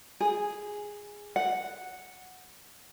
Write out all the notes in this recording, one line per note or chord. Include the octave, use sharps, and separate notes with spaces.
G#4
F#5